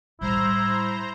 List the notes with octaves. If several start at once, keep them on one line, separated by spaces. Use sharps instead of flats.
A2 G3 E4 C5 A#5